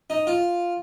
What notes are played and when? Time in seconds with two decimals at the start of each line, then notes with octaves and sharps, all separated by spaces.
0.10 D#4
0.27 F4